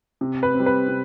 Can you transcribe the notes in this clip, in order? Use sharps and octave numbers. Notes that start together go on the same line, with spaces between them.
C3
B4
C4
G3
B4
C3